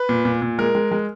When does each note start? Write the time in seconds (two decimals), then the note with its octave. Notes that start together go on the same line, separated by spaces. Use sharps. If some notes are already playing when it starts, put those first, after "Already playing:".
Already playing: B4
0.09 A#2
0.25 A#2
0.42 A#2
0.58 G#3 A#4
0.75 G#3
0.92 G#3